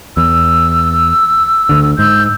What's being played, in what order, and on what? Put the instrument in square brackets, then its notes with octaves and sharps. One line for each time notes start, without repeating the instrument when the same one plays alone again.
[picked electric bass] E2 [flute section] E6
[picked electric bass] D2 D3
[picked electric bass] G#2 [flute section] E6 G6